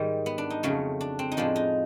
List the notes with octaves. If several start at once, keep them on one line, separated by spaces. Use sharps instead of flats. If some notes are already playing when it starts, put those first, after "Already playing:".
Already playing: G#2 D#3 G3 D#4
B3
D4
D#4
F2 C#3 F#3 A3
D4
C4
D#4
A2 F3 G#3 D4
D#4